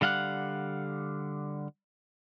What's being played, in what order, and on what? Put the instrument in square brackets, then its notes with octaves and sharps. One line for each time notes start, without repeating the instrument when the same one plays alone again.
[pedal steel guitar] D3 G3 F5 F#5 F#6